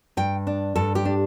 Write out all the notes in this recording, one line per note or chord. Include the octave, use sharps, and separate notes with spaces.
G2 G5
D4
G2 A4
G4
D4